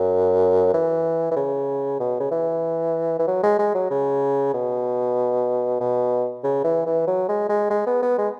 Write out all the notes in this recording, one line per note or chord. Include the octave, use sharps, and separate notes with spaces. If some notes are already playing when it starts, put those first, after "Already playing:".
Already playing: F#2
E3
E3
C#3
B2
C#3
E3
E3
F#3
G#3
G#3
F#3
C#3
B2
B2
C#3
E3
E3
F#3
G#3
G#3
G#3
B3
B3
G#3